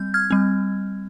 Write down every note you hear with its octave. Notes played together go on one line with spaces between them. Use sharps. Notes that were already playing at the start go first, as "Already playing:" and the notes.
Already playing: G3 C4 G6
F6 G#6
G3 C4